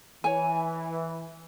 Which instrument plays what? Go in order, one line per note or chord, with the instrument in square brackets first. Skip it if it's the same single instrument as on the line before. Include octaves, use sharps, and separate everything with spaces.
[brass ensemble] E3 [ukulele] C#5 G#5